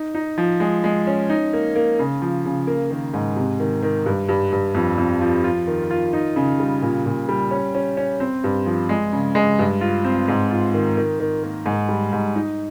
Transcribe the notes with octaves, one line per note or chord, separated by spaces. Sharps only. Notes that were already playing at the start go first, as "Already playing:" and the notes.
Already playing: D#4
D#4
F3
G#3
G#3
C#4
D#4
A#3
A#3
C#3
F3
C#3
A#3
D#3
G#2
C3
D#3
D#3
G2
G2
G2
F2
F2
F3
F4
D#3
F4
D#4
C#3
G3
A#2
A#2
G3
C#4
C#4
C#4
C4
G2
F3
G#3
C#3
G#3
G2
F4
C4
G#2
F4
D#3
D#3
D#3
A#3
G#2
G3
G#2
D#4